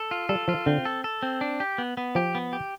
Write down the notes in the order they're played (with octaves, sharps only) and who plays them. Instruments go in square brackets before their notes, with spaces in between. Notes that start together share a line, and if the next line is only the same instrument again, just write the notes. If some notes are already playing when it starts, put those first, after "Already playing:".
Already playing: [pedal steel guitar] A4
F4
[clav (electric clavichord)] G3 [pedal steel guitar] A4
[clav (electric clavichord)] F3 [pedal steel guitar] F4
[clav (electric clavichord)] D3 [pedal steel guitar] C4
[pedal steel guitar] A4
A4
C4
D4
G4
B3
B3
[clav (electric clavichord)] F3 [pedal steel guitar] G4
[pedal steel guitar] B3
G4